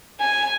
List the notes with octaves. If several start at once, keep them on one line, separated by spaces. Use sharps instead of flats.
G#5